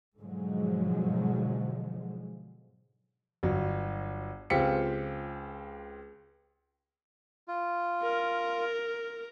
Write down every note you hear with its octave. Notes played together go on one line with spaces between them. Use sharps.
G#2 B2 D3 F3 F#3 G#3
G1 F#3
C#2 C4 F4 G4 B6 C#7
F4
A#4